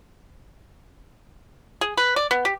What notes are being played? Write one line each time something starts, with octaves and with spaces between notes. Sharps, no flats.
G#4
B4
D5
B3
G4